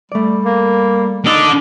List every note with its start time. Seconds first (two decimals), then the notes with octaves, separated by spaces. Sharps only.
0.12 G3 A3 D5
0.45 A#3
1.25 D4 D#4 A4